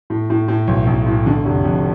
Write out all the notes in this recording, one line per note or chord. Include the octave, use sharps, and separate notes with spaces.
A2
A2
A2
B1
B1
A2
D3
F1
F2